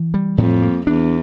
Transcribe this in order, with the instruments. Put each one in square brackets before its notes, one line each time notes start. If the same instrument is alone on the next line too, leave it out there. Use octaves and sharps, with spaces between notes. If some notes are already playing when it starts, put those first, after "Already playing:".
Already playing: [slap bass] E3
G3
[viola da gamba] F2 [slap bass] A2
[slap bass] A#3
[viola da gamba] E2 [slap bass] D4